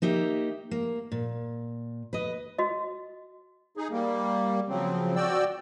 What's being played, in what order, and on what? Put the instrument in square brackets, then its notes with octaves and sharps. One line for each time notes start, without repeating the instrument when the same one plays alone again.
[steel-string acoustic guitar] A#3 D#4 G4 E5
A#3
A#2
B4 D#5
[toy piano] F#4 D#5
[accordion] D#4 G#4
G3 A#3
C#3 F3 F#3 C4
F#4 D5 G5 E6